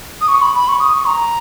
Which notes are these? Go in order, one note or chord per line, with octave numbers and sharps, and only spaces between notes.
D#6
C#6
B5
B5
C#6
D#6
C#6
A#5